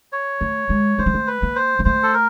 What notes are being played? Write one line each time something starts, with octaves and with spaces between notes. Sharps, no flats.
C#5
A3
G#3
A3 C5
G#3
A3
B4
A#3
C5
A#3
A3 C5
A4
A#4